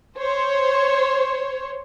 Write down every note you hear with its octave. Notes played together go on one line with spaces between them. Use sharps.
C5 C#5